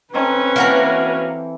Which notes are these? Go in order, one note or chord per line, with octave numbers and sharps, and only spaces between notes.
C4 C#4 D#4 A4 B4
E3 A#3 F#4 A#4